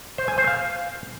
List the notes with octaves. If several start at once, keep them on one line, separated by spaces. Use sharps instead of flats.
C5
G#5
C5
F5